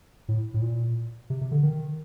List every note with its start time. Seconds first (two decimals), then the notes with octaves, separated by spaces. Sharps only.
0.28 A2
0.54 A2
0.62 A#2
1.30 C3
1.41 C3
1.51 D3
1.63 D#3